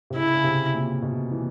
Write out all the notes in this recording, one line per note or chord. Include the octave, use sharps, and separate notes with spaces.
C3
C#3 E4
C#3
C3
A#2
B2
E3